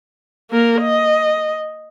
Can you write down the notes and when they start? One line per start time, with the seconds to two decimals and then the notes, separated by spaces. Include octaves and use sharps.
0.50 A#3 A#4
0.81 D#5